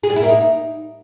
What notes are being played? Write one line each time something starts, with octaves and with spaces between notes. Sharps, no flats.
G#4
G3
E4
A#3
D#4